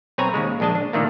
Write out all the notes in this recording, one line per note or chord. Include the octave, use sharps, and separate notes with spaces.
B1 C4 B4 C#5 G#5 A#5
D#2 C#3 G#3
A#1 G#3 D4 D#5 A5
D4
A#2 D3 D#3 A3 A#3